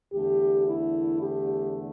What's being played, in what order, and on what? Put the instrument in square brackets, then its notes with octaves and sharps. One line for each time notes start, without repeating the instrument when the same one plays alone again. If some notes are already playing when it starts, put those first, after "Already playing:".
[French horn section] E2 D3 A3 G4
E4
G4